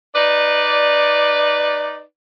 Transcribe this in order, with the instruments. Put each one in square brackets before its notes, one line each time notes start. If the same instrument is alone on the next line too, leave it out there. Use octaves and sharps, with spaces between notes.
[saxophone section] D#4 B4 D5